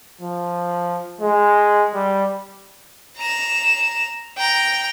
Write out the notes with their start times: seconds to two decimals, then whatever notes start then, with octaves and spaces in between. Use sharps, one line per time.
0.21 F3
1.21 G#3
1.95 G3
3.17 A#5 E7
4.38 G5 A#5